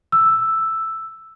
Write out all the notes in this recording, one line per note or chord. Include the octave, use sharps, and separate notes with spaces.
E6